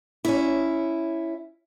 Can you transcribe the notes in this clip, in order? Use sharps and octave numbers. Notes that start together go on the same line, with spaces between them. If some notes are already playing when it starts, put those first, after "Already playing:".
C#4 E4